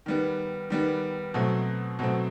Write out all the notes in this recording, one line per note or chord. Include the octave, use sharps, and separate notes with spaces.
D#3 G3 B3
D#3 G3 B3
B2 F#3 A3 C4
B2 F#3 A3 C4